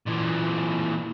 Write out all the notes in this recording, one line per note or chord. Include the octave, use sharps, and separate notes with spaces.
A#2 E3